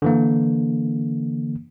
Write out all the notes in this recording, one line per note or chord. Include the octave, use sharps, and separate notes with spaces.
D3 E3 A#3